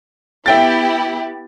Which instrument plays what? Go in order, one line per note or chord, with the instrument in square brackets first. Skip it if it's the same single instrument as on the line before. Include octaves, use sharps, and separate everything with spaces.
[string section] B3 E4 G4 [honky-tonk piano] E5 G5 A6